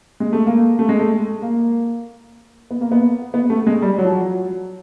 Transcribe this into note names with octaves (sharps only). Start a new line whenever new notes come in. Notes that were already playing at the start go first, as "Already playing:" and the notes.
G#3
A3
A#3
A3
G#3
A3
A#3
B3
A#3
B3
B3
A3
G#3
G3
F#3
F3
F#3